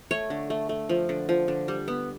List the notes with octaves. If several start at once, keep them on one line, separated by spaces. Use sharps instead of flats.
A3 C#5
D3
A3
A3
F3
D3
F3
D3
G3
B3